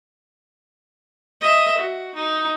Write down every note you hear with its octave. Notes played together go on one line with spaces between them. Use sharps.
D#5 E5
F#4
D#4